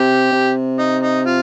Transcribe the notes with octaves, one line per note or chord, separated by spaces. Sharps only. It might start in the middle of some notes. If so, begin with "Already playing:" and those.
Already playing: C3 G4
C3
D#4
D#4
F4